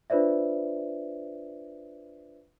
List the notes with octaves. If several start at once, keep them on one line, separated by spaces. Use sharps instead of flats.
D4 F4 B4 C5 D5 E5